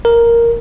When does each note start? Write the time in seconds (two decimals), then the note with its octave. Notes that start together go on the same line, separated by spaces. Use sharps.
0.05 A#4